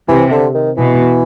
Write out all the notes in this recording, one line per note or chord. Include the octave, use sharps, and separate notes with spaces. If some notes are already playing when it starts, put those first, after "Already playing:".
C3 E3
D3
D#3
B2 E3